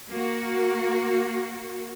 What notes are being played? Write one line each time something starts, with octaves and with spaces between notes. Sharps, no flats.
A#3 F#4